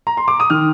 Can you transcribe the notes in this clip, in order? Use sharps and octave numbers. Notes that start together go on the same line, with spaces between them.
A#5
C6
D6
D#6
D#3 F6